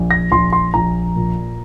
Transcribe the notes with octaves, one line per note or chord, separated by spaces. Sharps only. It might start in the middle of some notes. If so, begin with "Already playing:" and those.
Already playing: A#1
A#6
A#1 C6
C6
A#1 A#5
A#2